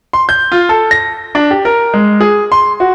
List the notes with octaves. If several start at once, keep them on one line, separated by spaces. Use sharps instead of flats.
C6
G6
F4
A4
A#6
D4
G4
A#4
G#3
G#4
C6
F#4